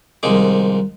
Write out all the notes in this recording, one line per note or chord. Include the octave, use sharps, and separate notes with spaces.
C2 D#3 F3 G#3 D6